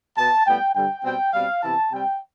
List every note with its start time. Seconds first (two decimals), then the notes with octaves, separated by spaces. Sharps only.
0.17 B2 B3 A5
0.46 A2 G3 B3 G5
0.75 G2 D3 G3 G5
1.04 B2 G3 C4 G5
1.33 B2 G3 C4 F5
1.63 C3 E3 B3 A5
1.92 C3 G3 C4 G5